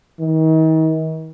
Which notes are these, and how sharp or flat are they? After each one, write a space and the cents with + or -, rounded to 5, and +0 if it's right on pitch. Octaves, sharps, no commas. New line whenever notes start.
D#3 +40